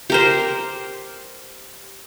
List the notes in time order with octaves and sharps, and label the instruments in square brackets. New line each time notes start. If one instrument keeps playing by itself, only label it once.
[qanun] G4 A#4 C5